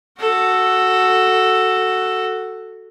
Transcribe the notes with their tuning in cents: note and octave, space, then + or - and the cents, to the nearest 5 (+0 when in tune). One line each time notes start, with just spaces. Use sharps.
F#4 +0 A4 +0